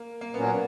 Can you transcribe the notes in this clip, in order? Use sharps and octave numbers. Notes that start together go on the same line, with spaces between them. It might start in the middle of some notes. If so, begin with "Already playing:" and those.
Already playing: A#3
A#3
A#2 F#3 B3 C#4